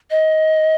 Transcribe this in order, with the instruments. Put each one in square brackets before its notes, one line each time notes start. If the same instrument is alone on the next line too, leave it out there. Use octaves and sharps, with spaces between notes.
[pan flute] D#5